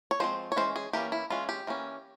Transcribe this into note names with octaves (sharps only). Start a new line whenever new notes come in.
C#5
F3 G#3 C4 C5
C#5
E3 G#3 C#4 C5
G#4
E3 A#3 C#4 G4
E4
E3 G#3 C#4 F4
G4
E3 A#3 C#4